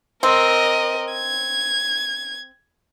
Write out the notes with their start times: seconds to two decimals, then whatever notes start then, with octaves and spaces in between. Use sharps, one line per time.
0.23 C4 A#4 D#5
1.12 G#6